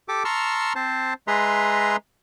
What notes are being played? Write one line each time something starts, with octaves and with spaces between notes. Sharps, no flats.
G4 A4 D6
A5 A#5 C6 C#6 E6 F6
C4 C5 A5
G#3 G#4 B4 E5 A#5 C6